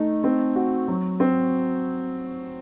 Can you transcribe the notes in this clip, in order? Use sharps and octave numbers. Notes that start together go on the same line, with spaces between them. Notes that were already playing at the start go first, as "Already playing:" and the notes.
Already playing: A3 D#4
C4
F#4
F#3
C4